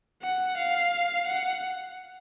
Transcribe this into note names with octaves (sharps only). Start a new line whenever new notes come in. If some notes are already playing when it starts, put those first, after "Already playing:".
F#5
F5
F#5